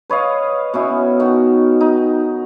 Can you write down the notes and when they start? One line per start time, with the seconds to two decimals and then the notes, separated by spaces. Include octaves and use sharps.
0.10 B4 C#5 D#5 F5
0.74 B2 C#4 E4
1.20 D#3 F#4
1.81 D#4